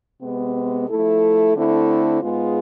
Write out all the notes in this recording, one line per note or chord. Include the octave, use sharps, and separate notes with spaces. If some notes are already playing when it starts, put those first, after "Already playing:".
C3 G#3 B3
F3 A3 E4 A4
D3 A3 C4 E4
G#2 G#3 B3 F4 G#4